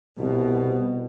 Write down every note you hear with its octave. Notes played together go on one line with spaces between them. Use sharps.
C2 B2